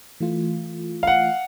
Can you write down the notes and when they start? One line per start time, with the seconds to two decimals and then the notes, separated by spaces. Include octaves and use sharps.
0.20 E3 A3 F4
1.03 F5 F#5